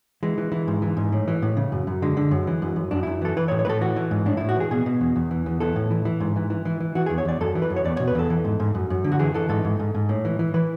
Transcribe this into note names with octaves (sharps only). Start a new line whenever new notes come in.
E3 G#3
E3
E3
G#2
E3
G#2
A2
E3
A2
C#3
F#2
F#2
D3 G#3
D3
F#2
E3
F#2
F#2
F#2 D4
F#2 E4
E3 A4
E3 B4
C#5
A2
C#5
A2 A4 B4
E3 F#4
E3
G#2
A2 D4
A2 E4
F#4
E3 G#4
B2 G#4
B2
E2
E2
E3
E2
E3 A4
A2
E3
E3
G#2
E3
E3
E3
E3
E3 F#4
E2 G#4
C#5
E2 D5
F#2 A4
E3
B4
F#2
C#5
E2 D5
B2 C#5
B4
E2 A4
E3
G#2
G#2
F#2
F#2
D3
F#4
E3 G#4
E3 A4
G#2 A4
G#2
G#2
G#2
A2
E3
E3
E3 B4